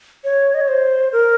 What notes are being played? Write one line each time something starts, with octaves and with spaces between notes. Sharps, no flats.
C#5
D#5
C#5
C5
A#4